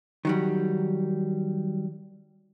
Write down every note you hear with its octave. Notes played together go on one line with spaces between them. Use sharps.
D#3 F#3 G3